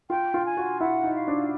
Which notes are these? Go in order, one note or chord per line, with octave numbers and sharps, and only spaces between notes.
F4 G5
F4
G#5
F#4
E4 F#5
D#4
F5
D4